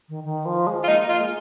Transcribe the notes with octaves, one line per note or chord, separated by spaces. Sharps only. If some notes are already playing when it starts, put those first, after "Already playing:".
D#3
D#3
F3
G#3
F4
A#3 D#4
F4
G#3